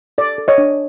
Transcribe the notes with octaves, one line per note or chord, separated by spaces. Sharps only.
A4 D5
A4
C#5 D#5
D4